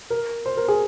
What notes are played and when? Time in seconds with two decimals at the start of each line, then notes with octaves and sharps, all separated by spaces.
0.10 A#4
0.46 C5
0.57 A#4
0.68 G#4